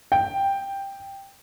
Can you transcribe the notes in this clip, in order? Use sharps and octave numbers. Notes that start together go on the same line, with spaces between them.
G5